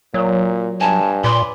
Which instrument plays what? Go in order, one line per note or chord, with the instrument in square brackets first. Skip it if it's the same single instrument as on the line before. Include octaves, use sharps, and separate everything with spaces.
[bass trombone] A#2 [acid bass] F#3
[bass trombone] G2 [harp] G#5 [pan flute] A5
[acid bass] A#2 [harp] B4 D5 [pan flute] C6